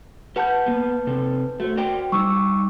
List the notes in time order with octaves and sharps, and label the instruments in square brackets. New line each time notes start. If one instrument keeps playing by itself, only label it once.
[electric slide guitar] G4 F#5 [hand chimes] B4 A5 G6
[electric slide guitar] A#3 B3
C3 C4 A4
[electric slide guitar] A3 [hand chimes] F#4 C5
[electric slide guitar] A#4 D5 G5
[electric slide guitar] G3 D#4 [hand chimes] C#6 D6 E6